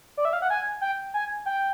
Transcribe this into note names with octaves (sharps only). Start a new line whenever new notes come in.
D5
E5
F5
F#5
G#5
G5
G#5
G5